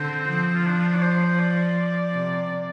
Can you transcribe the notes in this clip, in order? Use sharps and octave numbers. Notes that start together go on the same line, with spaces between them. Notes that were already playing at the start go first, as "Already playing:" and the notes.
Already playing: D3 C4
F3
F4
D4
D5
C5
D5
C3